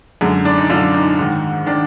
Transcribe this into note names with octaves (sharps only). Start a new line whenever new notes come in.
F#2 D3 G#3
D4
D#4
F#2 D3 F4
D#4
G#2 D#3
D#3 D4